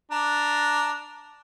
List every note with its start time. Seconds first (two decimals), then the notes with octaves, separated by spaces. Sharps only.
0.11 D4 A#5